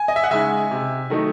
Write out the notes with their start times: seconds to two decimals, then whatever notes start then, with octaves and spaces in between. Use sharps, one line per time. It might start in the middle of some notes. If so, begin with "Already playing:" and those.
Already playing: G#5
0.08 D#5
0.16 E5
0.24 F#5
0.31 C#3 G#3 D#4 E5 G#5
0.71 C3
1.10 D#3 F#3 A3 D#4